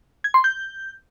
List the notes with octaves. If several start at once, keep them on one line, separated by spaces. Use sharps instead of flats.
G#6
C6
G6